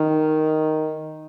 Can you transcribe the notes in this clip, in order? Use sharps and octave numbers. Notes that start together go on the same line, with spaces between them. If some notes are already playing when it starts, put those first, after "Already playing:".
Already playing: D#3